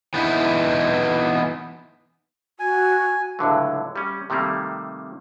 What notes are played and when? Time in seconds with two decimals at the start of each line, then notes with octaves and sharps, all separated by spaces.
0.14 E3 B3 D#4 E4 B4
2.59 F#4 G#5
3.39 C#2 A2 D3 F#3
3.96 G3 C#4
4.30 C3 D#3 G3 A3 A#3